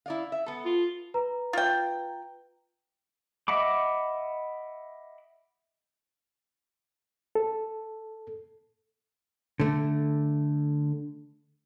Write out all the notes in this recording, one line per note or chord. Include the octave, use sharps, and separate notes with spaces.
E4 D5 F5
E5
B3 A4
F4
B4 A#5
F4 G5
D#5 E5 F#5 B5 D6
A4
D3 A3